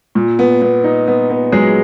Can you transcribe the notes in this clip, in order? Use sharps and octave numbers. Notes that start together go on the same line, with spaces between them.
A#2
B3
B3
D#4
B3
B3
F#3 G#3 G#4